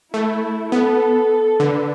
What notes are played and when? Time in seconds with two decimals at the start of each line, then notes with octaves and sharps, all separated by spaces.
0.14 A3 E4
0.72 B3 A4
1.60 D3 B4